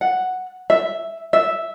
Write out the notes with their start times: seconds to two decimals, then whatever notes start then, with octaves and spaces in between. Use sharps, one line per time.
0.01 F#5
0.70 E5
1.33 E5